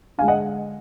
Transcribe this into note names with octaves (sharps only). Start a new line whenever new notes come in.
D3 G#3 F5 G#5
D#5 F#5